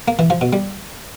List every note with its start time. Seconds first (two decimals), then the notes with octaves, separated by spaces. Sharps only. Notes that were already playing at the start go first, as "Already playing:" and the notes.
0.08 A#3
0.19 E3
0.30 F3
0.41 B2
0.53 G3